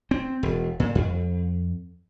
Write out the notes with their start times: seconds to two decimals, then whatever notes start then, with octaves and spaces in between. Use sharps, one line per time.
0.11 C4
0.43 E1
0.80 A#2
0.95 F2